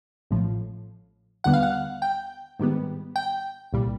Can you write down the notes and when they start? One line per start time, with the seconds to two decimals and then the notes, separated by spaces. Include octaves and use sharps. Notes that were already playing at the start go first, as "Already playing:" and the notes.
0.31 A1 A2 F3
1.44 D#2 D3 G3 B3 F#5
1.54 F5
1.63 F#5
2.02 G5
2.59 G#2 D#3 G3 B3
3.16 G5
3.73 C2 A#2 G3